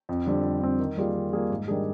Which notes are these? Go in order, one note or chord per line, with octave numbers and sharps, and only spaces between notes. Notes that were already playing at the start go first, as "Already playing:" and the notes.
F2
D3 G3 C4
F2
D3 G3 C4
D#3
G3 A#3 F4 G#4
D#3
G3 A#3 F4 G#4
G#2
D#3 G3 D4 G#4